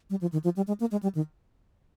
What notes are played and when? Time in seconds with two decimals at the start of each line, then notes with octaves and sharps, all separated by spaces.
0.10 G3
0.21 F3
0.32 D#3
0.44 F3
0.56 G3
0.67 G#3
0.80 A#3
0.91 G#3
1.03 G3
1.15 D#3